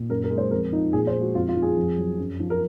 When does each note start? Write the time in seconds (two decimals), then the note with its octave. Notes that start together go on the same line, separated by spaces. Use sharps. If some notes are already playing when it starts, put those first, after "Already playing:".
Already playing: A#2
0.09 F#2 A#4
0.24 A#4
0.30 G#3
0.38 C5
0.51 F2 A#4
0.72 F3 D#4
0.93 A#2 G#4
1.07 C5
1.14 G#3
1.21 F#4
1.35 F2 F4
1.49 F4
1.56 F3
1.62 G#4
1.77 F2
1.97 F#3
2.18 F#2
2.40 F3
2.50 A#4